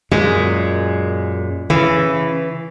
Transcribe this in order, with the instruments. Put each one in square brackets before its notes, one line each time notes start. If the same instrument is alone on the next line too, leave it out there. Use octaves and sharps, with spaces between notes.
[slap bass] F#2 A#2 [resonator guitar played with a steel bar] G#3
[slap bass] C#3 [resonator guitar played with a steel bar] E3